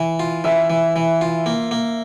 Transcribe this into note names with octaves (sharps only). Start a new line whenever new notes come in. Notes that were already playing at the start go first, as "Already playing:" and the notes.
Already playing: E3
F4
E3 E5
E3
E3
F4
A#3
A#3